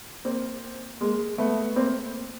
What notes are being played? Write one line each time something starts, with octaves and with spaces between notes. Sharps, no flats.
A#3 C4
G#3 A#3
A3 B3
A#3 C4